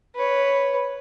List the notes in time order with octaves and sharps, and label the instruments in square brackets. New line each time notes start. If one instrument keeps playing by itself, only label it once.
[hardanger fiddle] B4 C#5